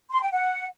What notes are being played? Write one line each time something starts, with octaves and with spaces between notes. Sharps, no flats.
C6
G5
F#5